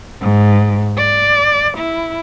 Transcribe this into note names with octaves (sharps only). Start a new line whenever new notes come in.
G#2
D5
E4